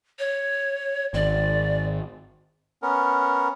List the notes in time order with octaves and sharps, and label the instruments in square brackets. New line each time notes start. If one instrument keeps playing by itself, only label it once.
[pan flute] C#5
[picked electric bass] G#1 [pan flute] D5
[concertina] B3 C#4 A#4